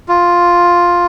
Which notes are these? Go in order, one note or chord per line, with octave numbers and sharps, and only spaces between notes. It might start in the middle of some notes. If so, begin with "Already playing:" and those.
F4